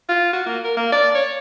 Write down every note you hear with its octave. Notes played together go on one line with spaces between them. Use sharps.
F4
F#4
A#3
A#4
A#3
D5
C#5